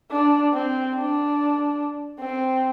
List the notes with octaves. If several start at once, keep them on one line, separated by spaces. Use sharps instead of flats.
D4
C4
D4
C4